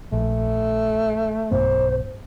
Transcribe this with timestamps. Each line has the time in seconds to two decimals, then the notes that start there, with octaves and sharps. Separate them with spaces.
0.12 A#1 A3
1.52 B1 G2 B3 C5